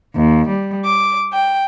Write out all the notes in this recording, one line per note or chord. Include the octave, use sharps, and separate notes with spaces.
D#2
G3
D6
G5